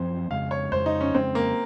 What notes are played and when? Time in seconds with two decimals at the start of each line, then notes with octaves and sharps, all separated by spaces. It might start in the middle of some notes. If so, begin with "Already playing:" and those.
Already playing: F#2 F3 C4 C5
0.30 F2 C#3 G#3 F5
0.51 C#5
0.72 F2 C#3 G#3 C5
0.86 D#4
1.01 C#4
1.14 F2 C#3 G#3 C4
1.35 A#3